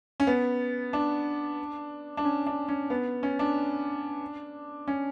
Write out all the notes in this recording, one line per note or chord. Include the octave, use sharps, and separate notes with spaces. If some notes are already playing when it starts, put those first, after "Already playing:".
C#4
B3
D4
D4
C#4
D4
C#4
B3
C#4
D4
C#4